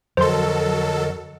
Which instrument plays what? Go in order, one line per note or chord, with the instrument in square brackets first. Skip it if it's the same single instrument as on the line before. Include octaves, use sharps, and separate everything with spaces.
[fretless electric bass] F2 [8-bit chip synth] D3 A#4 D#5 [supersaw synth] F#3 A4 [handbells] C5 C6